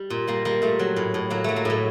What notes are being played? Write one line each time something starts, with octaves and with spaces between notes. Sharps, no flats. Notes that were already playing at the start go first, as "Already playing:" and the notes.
Already playing: G3
A#2
G3 A#3
G3 A#3
A#2 A3
F#3
A2
A2
F#3 A#3
F#3 A3
A#3
A2 A3